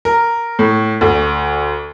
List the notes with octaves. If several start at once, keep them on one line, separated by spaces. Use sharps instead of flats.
A#4
A2
D2